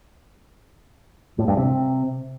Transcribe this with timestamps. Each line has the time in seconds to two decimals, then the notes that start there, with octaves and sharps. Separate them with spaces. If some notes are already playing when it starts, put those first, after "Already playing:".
1.39 A2
1.48 G2
1.57 C3